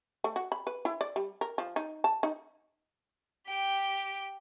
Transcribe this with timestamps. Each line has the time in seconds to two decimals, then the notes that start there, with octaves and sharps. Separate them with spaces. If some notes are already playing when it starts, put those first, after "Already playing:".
0.24 A3
0.36 F#4
0.52 B5
0.67 B4
0.85 E4
1.01 D5
1.16 G3
1.41 A#4
1.58 F3
1.76 D#4
2.04 A5
2.23 D#4
3.48 G4 G5